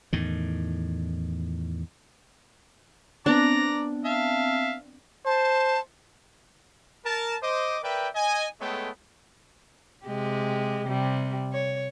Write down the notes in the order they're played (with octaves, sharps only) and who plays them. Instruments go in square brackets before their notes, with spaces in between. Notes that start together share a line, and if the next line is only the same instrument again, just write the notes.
[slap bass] E2 A2 D#3
[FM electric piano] B3 C4 [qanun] D4 [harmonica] D5 A#5
[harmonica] E5 F5 A5
[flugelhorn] C5 [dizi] A5
[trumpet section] A#4 A5
C5 D#5 D6
A#4 B4 D5 E5 G5
D#5 G#5
G#3 A3 B3 A4 C#5 G5
[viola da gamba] C3 G#3 G4
C3 G3
C#5